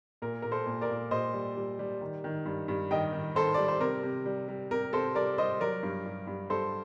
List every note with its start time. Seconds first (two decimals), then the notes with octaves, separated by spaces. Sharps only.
0.22 A#2 A#4
0.42 A#2 A#4
0.51 A4 C5
0.67 A#2
0.81 A#4 D5
0.90 A#2
1.11 A#2 C5 D#5
1.33 G3
1.57 G3
1.79 G3
2.01 D#3
2.24 D#3
2.46 G2
2.68 G2
2.91 D#3 D#5 G5
3.13 D#3
3.35 D#3 A4 C5
3.54 G3 D5
3.68 C5
3.80 C3 A#4
4.03 C3
4.26 G3
4.48 G3
4.71 C3 A#4
4.93 C3 A4 C5
5.15 G3 A#4 D5
5.38 G3 C5 D#5
5.60 F#3 A#4 D5
5.83 G2
6.05 G2
6.27 G2
6.50 G2 A4 C5